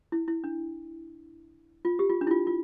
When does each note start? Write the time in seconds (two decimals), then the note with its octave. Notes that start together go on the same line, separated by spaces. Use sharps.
0.12 E4
0.28 E4
0.44 D4
1.85 F4
1.99 G4
2.10 F4
2.21 D4
2.27 E4
2.31 F4
2.47 F4